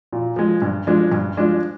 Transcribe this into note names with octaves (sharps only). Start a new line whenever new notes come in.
A#2
F3 G#3
G2
F3 G#3 D4
G2
F3 G#3 D4